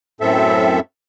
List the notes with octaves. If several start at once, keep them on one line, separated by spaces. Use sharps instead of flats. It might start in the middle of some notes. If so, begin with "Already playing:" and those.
F#2 A2 C4 A4 E5